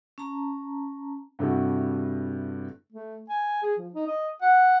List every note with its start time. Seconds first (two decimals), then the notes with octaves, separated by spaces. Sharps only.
0.18 C#4 A5 A#5
1.39 G2 C3 A3 E4 F#4
2.92 A3
3.29 G#5
3.63 G#4
3.78 F3
3.93 D#4
4.07 D#5
4.42 F#5